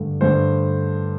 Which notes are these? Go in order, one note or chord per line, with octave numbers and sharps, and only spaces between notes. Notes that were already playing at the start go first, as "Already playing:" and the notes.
Already playing: G2 D3 A3
G2 D3 A3 C5